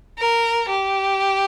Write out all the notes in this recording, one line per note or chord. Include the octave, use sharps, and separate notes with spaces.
A#4
G4